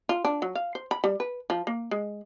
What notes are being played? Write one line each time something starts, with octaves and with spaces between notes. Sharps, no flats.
F4
D4
F#3
F5
C5
B5
G3
B4
F3
A#3
G#3